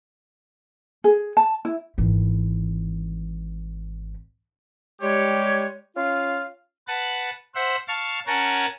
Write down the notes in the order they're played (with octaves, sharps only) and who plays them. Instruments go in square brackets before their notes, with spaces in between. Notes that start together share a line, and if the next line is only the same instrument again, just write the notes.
[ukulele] G#4
A5
E4
[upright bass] G#1 E3
[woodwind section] G3 G#3 G4 C#5
C#4 F4 F5
[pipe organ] B4 F#5 A5
C5 E5 F#5
F5 A5 C#6 F6
C#4 A#4 C#5 F#5 G#5 A5